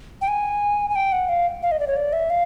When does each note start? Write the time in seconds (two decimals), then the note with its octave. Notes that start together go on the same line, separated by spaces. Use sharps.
0.21 G5
0.28 G#5
0.90 G#5
0.96 G5
1.12 F#5
1.29 F5
1.63 F5
1.72 D#5
1.80 D5
1.87 C#5
1.96 D5
2.13 E5
2.30 F5